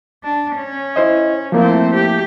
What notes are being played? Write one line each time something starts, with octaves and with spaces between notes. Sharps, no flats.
D4
C#4
E4 C5 D#5
F3 A3 A#3 C4 E4
G4